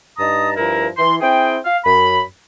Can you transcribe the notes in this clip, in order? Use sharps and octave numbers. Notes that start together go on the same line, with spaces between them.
G2 D#4 A5 A#5 D#6
G2 F3 E4 A#4
E3 C6
C4 E4 G#4 G5
F5
F#2 B5